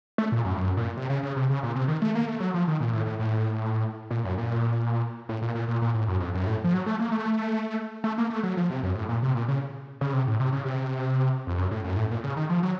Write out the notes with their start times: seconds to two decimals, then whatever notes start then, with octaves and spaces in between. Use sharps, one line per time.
0.18 A3
0.32 A#2
0.45 F#2
0.54 A2
0.57 F#2
0.77 A#2
0.97 C3
1.10 C#3
1.23 C#3
1.36 C3
1.50 C#3
1.63 A#2
1.75 C3
1.88 D#3
2.02 A3
2.15 A#3
2.28 A3
2.40 F#3
2.54 F3
2.68 D#3
2.80 A#2
2.93 A2
3.06 A2
3.20 A2
4.11 A#2
4.25 F#2
4.38 A#2
5.29 A2
5.42 A#2
5.55 A#2
5.68 A#2
5.82 A#2
5.94 A2
6.07 F#2
6.20 F2
6.34 F#2
6.47 A2
6.64 F3
6.73 F#3
6.86 A3
6.99 A#3
7.12 A3
8.04 A3
8.18 A#3
8.30 A3
8.43 F#3
8.57 F3
8.70 C3
8.83 F#2
8.95 A2
9.09 A#2
9.22 C3
9.35 A#2
9.48 C#3
10.01 C#3
10.13 C3
10.27 A2
10.40 C3
10.53 C#3
10.66 C3
11.47 F2
11.58 F#2
11.71 A2
11.84 F#2
11.97 A2
12.11 A#2
12.24 C#3
12.37 D#3
12.50 F3
12.63 F#3